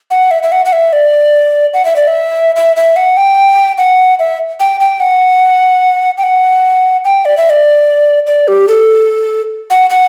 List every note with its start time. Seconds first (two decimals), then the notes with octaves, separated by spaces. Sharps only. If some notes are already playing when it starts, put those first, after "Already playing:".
0.11 F#5
0.31 E5
0.43 E5
0.52 F#5
0.65 F#5
0.73 E5
0.93 D5
1.74 F#5
1.85 E5
1.96 D5
2.07 E5
2.56 E5
2.76 E5
2.96 F#5
3.17 G5
3.78 F#5
4.19 E5
4.60 G5
4.80 G5
5.00 F#5
6.18 G5
6.23 F#5
7.05 G5
7.25 D5
7.37 E5
7.50 D5
8.27 D5
8.48 G4
8.68 A4
9.70 F#5
9.90 F#5